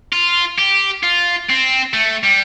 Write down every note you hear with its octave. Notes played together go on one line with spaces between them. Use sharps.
F4
G4
F4
C4
A3
G3